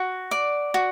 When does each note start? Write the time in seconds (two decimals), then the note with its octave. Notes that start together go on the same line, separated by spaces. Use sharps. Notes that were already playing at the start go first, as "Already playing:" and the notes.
Already playing: F#4
0.31 D5
0.74 F#4